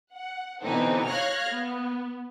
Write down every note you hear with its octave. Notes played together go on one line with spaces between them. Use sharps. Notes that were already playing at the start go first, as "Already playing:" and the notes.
F#5
B2 D3 E3 C4 D#4 A4
C#5 F5 F6 F#6 G#6 A#6
B3